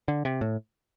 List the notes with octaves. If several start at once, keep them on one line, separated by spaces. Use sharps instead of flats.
D3
C3
A2